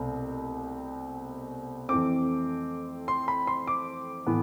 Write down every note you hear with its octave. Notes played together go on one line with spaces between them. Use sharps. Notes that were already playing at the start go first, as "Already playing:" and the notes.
Already playing: C2 B2 A3 C4
F2 E3 A3 C4 D6
C6
B5
C6
D6
A2 E3 B3